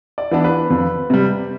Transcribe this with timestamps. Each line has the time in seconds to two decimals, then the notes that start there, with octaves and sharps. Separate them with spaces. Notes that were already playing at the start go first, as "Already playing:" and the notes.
0.18 D5
0.31 E3 B3 D4
0.44 B4
0.70 F2
1.10 C3 G3